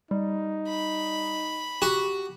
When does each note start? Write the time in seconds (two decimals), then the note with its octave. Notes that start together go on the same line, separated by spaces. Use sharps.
0.11 G3 D#4
0.68 B5
1.82 F#4 G4